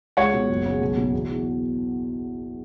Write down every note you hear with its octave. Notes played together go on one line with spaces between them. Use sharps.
C#2 C#5 F#5
B2
F#1
C#3
B1
B2
E2
E3